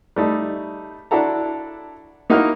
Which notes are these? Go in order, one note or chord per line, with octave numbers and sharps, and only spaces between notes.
G3 A3 D#4
D4 E4 F#4 A4 A#5
A#3 D#4 E4 F#4 A#4 F6